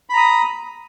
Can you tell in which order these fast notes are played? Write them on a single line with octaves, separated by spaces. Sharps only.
B5 A#5 D#6